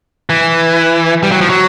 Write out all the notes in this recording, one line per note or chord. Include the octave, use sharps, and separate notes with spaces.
E3
G3
F#3
F3
F#3